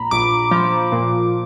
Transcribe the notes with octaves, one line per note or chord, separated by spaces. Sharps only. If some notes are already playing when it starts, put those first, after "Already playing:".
Already playing: A#1 A#2 A#5 B5
A#1 D6
F3
A#2